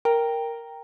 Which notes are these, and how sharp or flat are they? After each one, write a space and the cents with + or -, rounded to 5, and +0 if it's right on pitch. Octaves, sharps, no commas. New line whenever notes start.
A#4 +0 G5 +5 A#5 +0